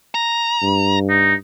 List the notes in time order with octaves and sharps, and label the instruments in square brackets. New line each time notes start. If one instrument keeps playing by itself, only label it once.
[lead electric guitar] A#5
[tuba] G2
[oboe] D#4